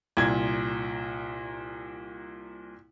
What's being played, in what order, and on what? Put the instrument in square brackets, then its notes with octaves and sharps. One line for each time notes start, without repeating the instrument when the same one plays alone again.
[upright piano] C2 A#2 G#6